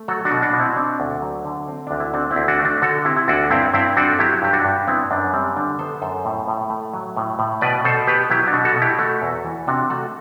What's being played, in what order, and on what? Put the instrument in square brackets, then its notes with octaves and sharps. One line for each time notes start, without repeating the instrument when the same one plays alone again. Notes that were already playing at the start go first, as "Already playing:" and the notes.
Already playing: [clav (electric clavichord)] A3
F#3 F#4 A4
D4 F#4
B2
D4 F#4
B2
C4 E4
C4 D4
D2
F#3
D3
C4
D2 D4
E4
C4 D4 F#4
C4 E4
D2
D4 F#4
A3
D4 F#4
D3 F#4 A4
C4 E4 G4
E4
D2 D4 F#4
G2 C4 E4
G2 C4 E4
C4 D4 F#4
A4
F#3 E4 G4
G2 G4
D4 F#4
G2
B3 C4 E4
F#2 D4
G3 C4
D3 D4
B3 A4 C5
F#2 A4 C5
A2
A2
A3
F#3
A2
A2
B2 B4 D5
B2 A4 C5
B3 G4 B4
F#3 E4 G4
D4 F#4
B2
F#4 A4
B2
E4 G4
A3 F#4 A4
E2
E3
C3 D4 F#4
A3 F#4 A4